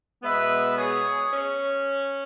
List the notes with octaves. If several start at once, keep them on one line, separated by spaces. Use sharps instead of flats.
B2 G#3 B3 B4 E5
G#4 C#5
C#4